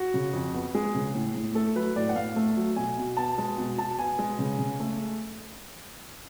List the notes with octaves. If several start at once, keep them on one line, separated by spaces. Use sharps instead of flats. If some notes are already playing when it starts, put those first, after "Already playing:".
Already playing: F#4
C#3
F2
B3
G#3 G#4
C#3
A2
A2
A3 A4
F#3 B4
A2 D5
F#5
A2 F5
A3
F#3
B2 G#5
B2
B3 A5
G#3
B2
B2 A5
B3 G#5
G#3
C#3
C#3
A3